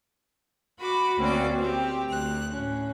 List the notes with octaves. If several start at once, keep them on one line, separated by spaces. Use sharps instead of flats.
F#4 B5 D6
D2 A#3 C4 C#4 F#4 D5
C4 G4
D2 F#6
A2 C#4